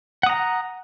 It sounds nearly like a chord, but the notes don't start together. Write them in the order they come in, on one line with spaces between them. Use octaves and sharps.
F#5 D#6 A#5